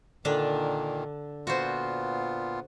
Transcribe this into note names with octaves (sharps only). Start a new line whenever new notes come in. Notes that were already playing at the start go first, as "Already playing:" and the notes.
A#2 D3 D#3 D4
A#2 B3 F4 F#4 C5